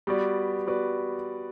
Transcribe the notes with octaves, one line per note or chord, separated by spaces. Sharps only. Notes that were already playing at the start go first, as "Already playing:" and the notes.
G3 B3 F#4 B4 D5
G3 B3 F#4 B4 D5